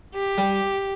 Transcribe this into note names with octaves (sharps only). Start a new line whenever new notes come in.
G4
G3